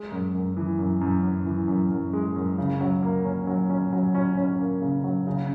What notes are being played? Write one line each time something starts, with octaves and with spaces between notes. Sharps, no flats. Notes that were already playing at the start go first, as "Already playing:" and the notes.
Already playing: G#3
F#2
F#2
E3
F#2
F#2
F#2
E3
F#2
F#2
G#3
F#2
C#3
F#3
A#3
C#4
F#3
C#4
F#3
C#4
C#4
A#3
C#3
F#3
C#3